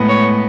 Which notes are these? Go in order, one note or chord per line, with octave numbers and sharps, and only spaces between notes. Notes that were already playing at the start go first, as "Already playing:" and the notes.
Already playing: A2 G#3 B3
C#5